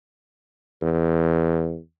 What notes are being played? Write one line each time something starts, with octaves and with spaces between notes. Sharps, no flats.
E2